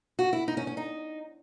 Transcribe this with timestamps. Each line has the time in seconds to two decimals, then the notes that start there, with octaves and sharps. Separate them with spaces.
0.19 F#4
0.33 E4
0.48 D#4
0.57 C#4
0.67 C#4
0.77 D#4